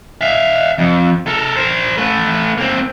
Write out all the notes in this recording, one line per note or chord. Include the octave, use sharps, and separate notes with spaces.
E5 F5
F2
A4 A#4
A#4 C5
A3 B4
A#3 C4